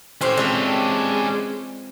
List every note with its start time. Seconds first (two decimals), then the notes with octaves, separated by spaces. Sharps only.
0.21 A2 C4 C#4 G4
0.37 E3 G#3 C4 D4 F4 A4